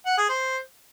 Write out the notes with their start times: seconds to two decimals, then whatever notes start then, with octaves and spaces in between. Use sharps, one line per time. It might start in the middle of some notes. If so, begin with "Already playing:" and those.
0.06 F#5
0.17 G#4
0.29 C5